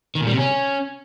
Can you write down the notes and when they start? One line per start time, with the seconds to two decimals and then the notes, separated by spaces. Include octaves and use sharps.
0.15 D#3
0.21 A#2
0.27 G3
0.32 C3
0.38 C#4